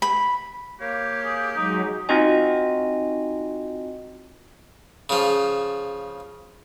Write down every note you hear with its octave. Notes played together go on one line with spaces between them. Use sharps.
B5
A#3 G4 C#5 F5
G#4
F#3 G#3 D#4
C4 D#4 F4 F#4 D#5 G#5
C#3 F3